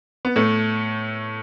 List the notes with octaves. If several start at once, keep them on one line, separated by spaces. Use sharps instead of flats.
B3
A2 A3